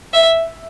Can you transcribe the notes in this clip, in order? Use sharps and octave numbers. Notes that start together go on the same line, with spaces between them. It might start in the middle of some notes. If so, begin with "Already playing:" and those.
E5